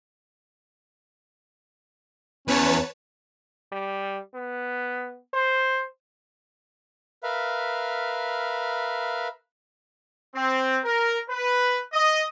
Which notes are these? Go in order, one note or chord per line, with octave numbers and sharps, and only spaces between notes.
E2 C#4 B4 C#5 A5
G3
B3
C5
A#4 B4 E5 F5
C4
A#4
B4
D#5